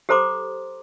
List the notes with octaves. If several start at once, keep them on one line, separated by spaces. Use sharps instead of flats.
G4 A4 C5 A#5 C6 D6